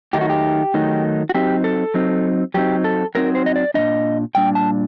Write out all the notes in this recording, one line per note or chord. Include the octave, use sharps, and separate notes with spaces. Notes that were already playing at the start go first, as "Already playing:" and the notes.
D#3 F#3 A3 D#4 G4
F#4
G4
D#3 F#3 A3 D#4
F#4
F#3 C4 D#4 G4
A4
F#3 C4 D#4
F#3 C4 D#4 G4
A4
F#3 C4 D#4 A#4
C5
D#5
D5
A#2 G3 D4 D#5
A#2 G3 D4 G5
A5